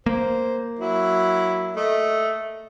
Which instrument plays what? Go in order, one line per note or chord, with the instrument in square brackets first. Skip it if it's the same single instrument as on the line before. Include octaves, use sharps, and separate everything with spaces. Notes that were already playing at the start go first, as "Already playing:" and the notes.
[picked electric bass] A#3 [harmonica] C5
[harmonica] F#3 E4
A3 D#5